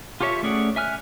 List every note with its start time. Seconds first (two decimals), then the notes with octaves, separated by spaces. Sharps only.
0.20 F4 G4 A4 C#5 E5
0.43 A3 C#4 G#4 D5 F#5
0.76 E5 G#5 F6 F#6